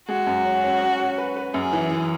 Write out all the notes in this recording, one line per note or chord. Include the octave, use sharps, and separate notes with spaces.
G#3 F#4
F#2
C#4
C#4
C#4
C#4
B4
B4
F#2 G#4
E3
E3